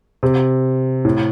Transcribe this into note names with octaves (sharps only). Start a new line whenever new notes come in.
C3
A2